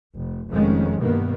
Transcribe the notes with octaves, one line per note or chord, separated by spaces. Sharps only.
F1
F1 F2 D#3 G#3 C#4
G2 B2 D#3 A#3 B3